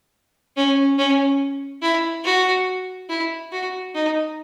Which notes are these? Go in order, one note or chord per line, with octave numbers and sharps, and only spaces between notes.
C#4
C#4
E4
F#4
E4
F#4
D#4